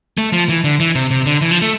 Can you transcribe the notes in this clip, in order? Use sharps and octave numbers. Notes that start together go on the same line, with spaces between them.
A3
F3
E3
D3
E3
C3
C3
D3
E3
F3
A3